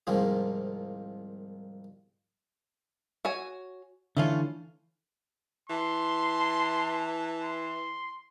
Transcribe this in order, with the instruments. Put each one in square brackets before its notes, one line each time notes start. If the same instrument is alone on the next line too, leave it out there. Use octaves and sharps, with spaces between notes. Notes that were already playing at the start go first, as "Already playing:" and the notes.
[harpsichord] C2 G#2 D#3 F3 A#3
[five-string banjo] F#4 C#5 G#5
[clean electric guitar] D3 E3 [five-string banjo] A3 C#4 F4
[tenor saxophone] E3 [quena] A5 [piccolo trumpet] C6
[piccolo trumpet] C6